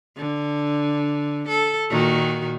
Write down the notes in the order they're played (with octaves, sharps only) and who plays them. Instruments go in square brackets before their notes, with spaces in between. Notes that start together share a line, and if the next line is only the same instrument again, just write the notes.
[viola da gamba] D3
A4
A#2 D#3 F#4